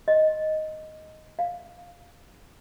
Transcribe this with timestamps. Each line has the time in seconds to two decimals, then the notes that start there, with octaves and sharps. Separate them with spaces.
0.08 D#5
1.39 F5